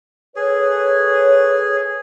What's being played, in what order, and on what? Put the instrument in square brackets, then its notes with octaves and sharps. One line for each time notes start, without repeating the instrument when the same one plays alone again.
[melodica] G#4 [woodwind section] A4 B4 C#5